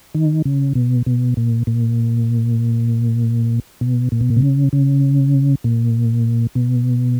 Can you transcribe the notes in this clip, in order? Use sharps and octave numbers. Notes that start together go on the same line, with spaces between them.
D#3
C#3
B2
B2
A#2
A#2
B2
A#2
B2
A#2
C3
C#3
C#3
A#2
B2